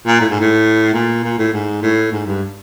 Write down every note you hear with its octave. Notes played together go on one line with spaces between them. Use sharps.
A#2
A2
G#2
A2
A#2
A#2
A2
G#2
A2
G#2
G2